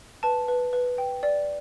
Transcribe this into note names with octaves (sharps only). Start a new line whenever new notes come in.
B4 A5
B4
B4
G5
D5